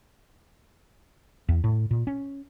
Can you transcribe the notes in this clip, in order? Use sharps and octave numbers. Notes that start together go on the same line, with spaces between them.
E2
A2
A#2
C#4